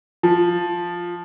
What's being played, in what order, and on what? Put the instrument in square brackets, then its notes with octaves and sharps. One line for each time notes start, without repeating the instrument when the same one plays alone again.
[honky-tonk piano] F3